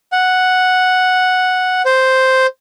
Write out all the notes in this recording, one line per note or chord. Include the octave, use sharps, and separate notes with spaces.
F#5
C5